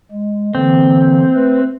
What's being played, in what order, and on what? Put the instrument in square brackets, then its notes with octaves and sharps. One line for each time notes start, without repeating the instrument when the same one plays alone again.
[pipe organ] G#3
[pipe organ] D3 E3 A#3 [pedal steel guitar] C4
[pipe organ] A3 B4